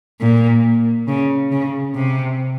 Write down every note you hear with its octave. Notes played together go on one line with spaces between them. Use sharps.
A#2
C#3
C#3
C3